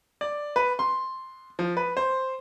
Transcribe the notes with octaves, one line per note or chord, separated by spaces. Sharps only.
D5
B4
C6
F3
B4
C5